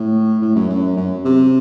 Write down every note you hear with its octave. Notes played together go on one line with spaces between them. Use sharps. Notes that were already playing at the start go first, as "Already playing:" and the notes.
Already playing: A2
A2
F#2
F#2
F#2
C3